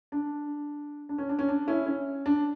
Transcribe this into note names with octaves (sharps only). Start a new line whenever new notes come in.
D4
D4
C#4
D4
C#4
D4
C#4 E4
C#4
D4